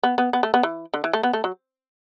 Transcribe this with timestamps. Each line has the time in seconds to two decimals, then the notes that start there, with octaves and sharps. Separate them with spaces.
0.03 B3
0.18 B3
0.33 B3
0.43 A3
0.54 B3
0.63 E3
0.94 D3
1.04 E3
1.13 A3
1.23 B3
1.33 A3
1.44 F#3